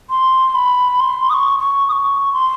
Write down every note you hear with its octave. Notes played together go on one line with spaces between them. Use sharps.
C6
B5
C6
D#6
C#6
C#6
D#6
C#6
C6